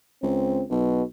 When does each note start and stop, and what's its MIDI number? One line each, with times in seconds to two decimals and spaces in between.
0.23 0.64 37
0.23 0.63 60
0.70 1.03 35
0.70 1.03 47